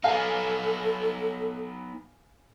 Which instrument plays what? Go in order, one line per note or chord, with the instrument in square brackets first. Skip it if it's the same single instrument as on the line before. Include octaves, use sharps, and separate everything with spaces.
[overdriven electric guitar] B3 D#4 [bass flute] A4 [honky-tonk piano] F5 G#5